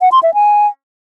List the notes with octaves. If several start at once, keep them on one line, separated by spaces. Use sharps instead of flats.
F#5
C6
E5
G#5